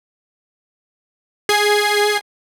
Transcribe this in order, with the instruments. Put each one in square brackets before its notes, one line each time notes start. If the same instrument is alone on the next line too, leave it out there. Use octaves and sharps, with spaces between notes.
[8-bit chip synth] G#4 G#6 C7